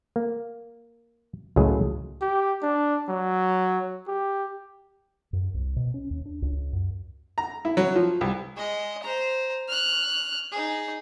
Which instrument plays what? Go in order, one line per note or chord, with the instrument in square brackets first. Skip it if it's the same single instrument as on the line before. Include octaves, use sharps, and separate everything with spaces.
[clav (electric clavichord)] A#3
C#2 A2 F#3 G#4
[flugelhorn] G4
D4
F#3
G4
[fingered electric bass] F#2
C2
B2
C#4
D#2
D4
C#2
F#2
[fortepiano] A#5
E4
F#3
F3
C2
[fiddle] G#3 D#5
C5 A#5
F6 F#6
D#4 G#4